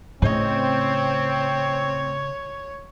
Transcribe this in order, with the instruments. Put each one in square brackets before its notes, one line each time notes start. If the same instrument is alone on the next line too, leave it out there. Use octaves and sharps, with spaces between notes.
[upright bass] A2 [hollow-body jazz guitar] C#3 D#5 [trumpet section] C4 [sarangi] C#5